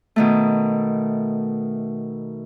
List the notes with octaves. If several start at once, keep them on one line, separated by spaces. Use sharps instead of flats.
B2 D#3 A3